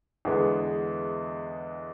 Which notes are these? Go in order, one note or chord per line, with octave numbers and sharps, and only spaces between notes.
E2 D3 G#3 B3